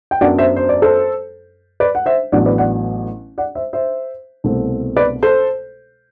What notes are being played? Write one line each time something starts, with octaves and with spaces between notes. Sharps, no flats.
G5
F#2 F#3 B3 D4 D5 F#5
C5 E5
C5
D5
A4 C5
B4 D5
F#5
C5 E5
A1 A2 F#3 B3 D4 D5 F#5
B4 D5
D5 F#5
D5 F#5
C5 E5
C5 E5
C2 B2 A3 C4
B4 D5
A4 C5